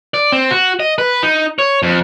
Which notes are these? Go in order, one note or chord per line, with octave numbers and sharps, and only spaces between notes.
D5
C4
F#4
D#5
B4
D#4
C#5
F2